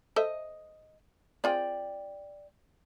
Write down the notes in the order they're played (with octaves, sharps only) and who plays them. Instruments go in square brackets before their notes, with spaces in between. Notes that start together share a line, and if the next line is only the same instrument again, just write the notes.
[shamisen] A4 C5 E5 [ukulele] D#5
[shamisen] C4 F4 G#4 [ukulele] D5 G5